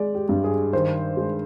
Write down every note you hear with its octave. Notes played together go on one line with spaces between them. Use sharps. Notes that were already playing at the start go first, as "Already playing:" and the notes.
Already playing: G#3 D5
G4
G2
G#4
D#3 C5
G#3